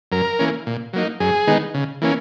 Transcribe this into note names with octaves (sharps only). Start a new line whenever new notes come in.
F#2 A#4
E3 A#3 C#4
A#2
F#3 A#3 D#4
F#2 G#4
D#3 G#3 B3 D#4
C#3
E3 A#3 C#4